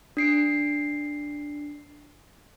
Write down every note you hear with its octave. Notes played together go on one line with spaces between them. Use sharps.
D4 C7 D7